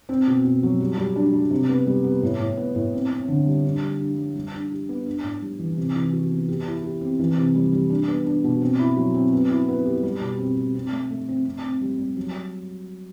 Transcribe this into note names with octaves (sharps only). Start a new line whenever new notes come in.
C4
B2
B2
F#3
G3
G3
D4
G3
C3
B3
G3
B3
A2
A2
B3
A2
C4
C4
D3
G3
D4
G3
D4
G3
G3
D4
G4
B3
D4
A2
G3
E3
C3
E3
F#4
B3
G4
E4
G4
C4
E3
C3
G3
G3
D4
B3
D4
B2
C4
E4
F#3
C4
B3
E4
B3
G4
G3
B2
C4
C4
C4
A3
A3
C4
C4
C4
G3
G3
F#3